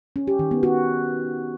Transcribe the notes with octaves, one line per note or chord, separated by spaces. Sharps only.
C#4
G4
D#3
B3
F#4